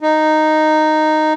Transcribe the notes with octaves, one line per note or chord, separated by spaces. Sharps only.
D#4